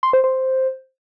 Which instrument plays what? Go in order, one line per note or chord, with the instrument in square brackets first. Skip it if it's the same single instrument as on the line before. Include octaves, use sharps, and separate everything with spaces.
[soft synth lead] C6
C5
C5